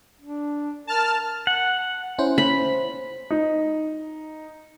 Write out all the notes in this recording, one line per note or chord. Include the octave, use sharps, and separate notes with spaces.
D4
A#4 A5 F6
F#5
C#4 E4 C5
B5
D#4